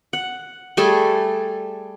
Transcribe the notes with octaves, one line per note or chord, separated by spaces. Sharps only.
F#5
G3 A3 G#4 A4